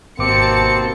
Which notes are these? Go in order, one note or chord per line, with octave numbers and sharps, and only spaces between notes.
G#1 D#2 B2 A#3 C4 A5 D6 C#7